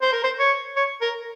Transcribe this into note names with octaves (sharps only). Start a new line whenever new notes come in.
C5
A#4
C5
C#5
C#5
A#4